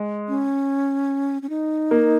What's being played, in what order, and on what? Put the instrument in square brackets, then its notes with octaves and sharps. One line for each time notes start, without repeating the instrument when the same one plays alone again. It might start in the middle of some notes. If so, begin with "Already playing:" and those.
Already playing: [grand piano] G#3
[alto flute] C#4
C#4
D#4
[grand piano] A#3